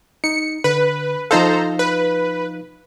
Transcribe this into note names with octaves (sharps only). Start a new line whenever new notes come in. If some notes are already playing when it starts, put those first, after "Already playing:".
D#4 C#7
D3 B4
F3 D#4 A4 C5 F5 A#5
B4